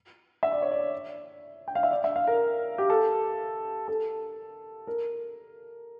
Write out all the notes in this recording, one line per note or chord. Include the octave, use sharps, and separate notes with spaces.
E5
D5
C#5
D5
G5
F5
E5
D5
E5
F5
A#4
G4
A4
A4
A#4